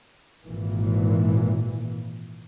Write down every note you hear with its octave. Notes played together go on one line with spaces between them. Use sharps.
G#1 A#2 E3